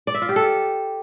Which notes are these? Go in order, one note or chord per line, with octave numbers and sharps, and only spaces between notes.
D5
E5
F4
G4
A4